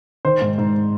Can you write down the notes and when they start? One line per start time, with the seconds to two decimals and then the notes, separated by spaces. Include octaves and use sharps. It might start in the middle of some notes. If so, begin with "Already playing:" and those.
0.25 D#3 C5
0.41 G#2
0.58 G#2